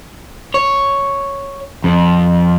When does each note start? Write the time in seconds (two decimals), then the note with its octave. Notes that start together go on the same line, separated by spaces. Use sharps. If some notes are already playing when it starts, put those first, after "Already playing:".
0.54 C#5
1.84 F2